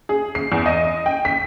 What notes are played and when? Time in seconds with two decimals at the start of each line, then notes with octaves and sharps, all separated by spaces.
0.09 G#4
0.35 C7
0.52 E2
0.66 D#5
1.06 G5
1.25 B6